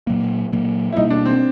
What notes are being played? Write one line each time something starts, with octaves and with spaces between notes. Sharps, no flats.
A#2 F#3 A#3
A#2 F#3 A#3
E4
B2 G3 A#3 D#4
D4
C4